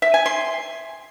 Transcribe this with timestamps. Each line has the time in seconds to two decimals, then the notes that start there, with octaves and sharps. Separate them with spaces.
0.02 E5
0.14 G#5
0.26 C6